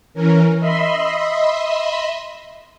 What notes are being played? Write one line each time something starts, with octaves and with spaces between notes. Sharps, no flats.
E3 C#4 A#4
D#5 E5 B5 C6